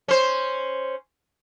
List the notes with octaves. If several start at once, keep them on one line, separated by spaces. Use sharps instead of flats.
C#4 C5